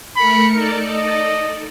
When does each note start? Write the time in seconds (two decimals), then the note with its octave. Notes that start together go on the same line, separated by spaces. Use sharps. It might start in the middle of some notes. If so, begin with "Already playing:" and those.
0.17 A3 A#4 B5 C#7
0.54 D#4 A4 A#4 D5
0.88 D#5